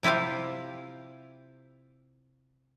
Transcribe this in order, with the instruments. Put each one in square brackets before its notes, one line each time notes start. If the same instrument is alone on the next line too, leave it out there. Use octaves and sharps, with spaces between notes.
[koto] C3 E4 F4 G4 F5